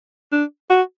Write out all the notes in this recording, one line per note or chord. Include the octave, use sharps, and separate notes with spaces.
D4
F#4